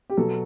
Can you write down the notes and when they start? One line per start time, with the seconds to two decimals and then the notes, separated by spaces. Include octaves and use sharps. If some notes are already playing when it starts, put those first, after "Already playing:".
0.10 G4
0.17 B2 F#3 A4